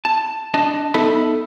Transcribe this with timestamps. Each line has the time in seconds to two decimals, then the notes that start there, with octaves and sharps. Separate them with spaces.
0.05 A5
0.54 D4 D#5 A5
0.94 B3 D#4 A4 E5 A5 B5